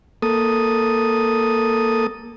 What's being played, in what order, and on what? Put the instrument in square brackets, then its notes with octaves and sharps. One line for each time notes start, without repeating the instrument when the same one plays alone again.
[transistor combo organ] A#3 A4 D#6